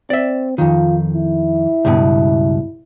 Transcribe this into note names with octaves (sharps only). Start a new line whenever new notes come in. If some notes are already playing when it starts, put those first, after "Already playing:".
C4 D5 E5
F2 D#3 F4
E4
C#2 G2 B2